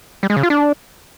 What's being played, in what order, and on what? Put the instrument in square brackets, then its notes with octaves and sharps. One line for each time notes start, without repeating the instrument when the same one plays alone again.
[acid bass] G3
G#3
C#3
F4
D4